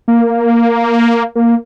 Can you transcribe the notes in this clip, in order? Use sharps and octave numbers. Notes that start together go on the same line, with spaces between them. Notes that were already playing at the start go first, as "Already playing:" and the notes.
A#3
A#3